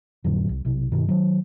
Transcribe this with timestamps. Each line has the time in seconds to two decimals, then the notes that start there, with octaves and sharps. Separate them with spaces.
0.24 F2 A2 D3 F#3
0.49 C2
0.65 B1 C3
0.92 G2 B2 D#3
1.08 D#3 F#3